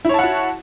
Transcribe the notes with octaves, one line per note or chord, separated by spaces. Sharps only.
E4 F#4 C#5 F#5 A5